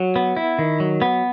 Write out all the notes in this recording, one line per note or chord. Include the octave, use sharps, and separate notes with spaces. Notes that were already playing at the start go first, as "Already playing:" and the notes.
Already playing: F#3
B3
E4
D#3
F#3
B3